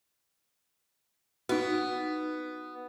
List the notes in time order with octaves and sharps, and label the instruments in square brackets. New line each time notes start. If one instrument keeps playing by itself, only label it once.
[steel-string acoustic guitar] B3 [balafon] D#4 F#4